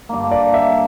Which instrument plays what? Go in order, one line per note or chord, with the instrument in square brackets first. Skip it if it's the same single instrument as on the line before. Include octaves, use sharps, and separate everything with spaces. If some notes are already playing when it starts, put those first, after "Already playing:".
[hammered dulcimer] G2 D3 A#3
[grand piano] D5
E5